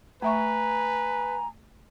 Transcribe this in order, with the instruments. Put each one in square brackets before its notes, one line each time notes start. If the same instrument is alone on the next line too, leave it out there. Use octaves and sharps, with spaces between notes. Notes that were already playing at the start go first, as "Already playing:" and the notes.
[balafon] A3 E5 C#6 [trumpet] B4 [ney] G#5 [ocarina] A#5